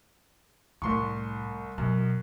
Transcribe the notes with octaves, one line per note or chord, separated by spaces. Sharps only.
C2 A2 C6 C#6
F#2 B2